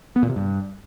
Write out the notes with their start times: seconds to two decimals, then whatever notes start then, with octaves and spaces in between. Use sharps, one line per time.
0.16 B3
0.23 A#2
0.29 C3
0.36 G2